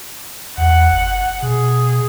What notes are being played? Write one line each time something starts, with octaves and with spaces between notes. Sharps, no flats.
E2 F#5
G1
B2 G#4